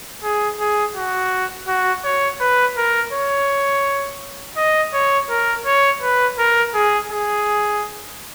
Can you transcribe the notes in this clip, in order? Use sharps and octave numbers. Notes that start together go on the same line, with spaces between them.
G#4
G#4
F#4
F#4
C#5
B4
A#4
C#5
D#5
C#5
A#4
C#5
B4
A#4
G#4
G#4